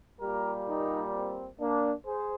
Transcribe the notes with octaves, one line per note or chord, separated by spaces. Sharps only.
A#2 G3 A#3 G4 A#4
D#4 G4
C4
A#3 D4
G#4 C5